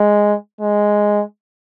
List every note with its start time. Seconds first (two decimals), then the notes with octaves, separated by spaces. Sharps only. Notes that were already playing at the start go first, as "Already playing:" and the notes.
Already playing: G#3
0.61 G#3